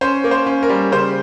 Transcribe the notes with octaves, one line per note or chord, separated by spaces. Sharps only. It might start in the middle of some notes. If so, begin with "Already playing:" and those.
C#4 C5
A#3
C5
C#4
A#4
G3
C#3 C5